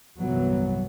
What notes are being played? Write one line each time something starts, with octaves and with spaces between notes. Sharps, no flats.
C2 G2 E3 F#3 B3